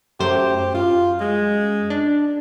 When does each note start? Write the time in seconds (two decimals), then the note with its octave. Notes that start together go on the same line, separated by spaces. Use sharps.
0.20 F#2 A3 G4 C5
0.74 F#2 F4
1.20 G#3
1.90 D4